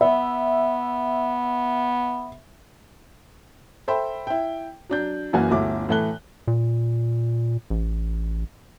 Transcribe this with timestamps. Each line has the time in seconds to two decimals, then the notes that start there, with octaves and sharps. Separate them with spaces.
0.01 B3 E5
3.88 A4 C5 E5 G5 B5
4.27 E4 G5
4.90 F#3 D4 G6
5.33 F#1 F#2 E3 A#3 F#5 G#5
5.51 G1 D2 E4 F#4 D6
5.89 A2 E3 A3 A4 F#6 G7
6.48 A#2
7.70 A1